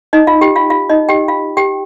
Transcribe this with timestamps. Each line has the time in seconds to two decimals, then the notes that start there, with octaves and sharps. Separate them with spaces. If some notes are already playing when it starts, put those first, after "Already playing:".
0.13 D#4 D#5
0.27 F4 F5
0.41 G4 G5
0.56 F4 F5
0.70 F4 F5
0.89 D#4 D#5
1.09 G4 G5
1.28 F4 F5
1.57 G4 G5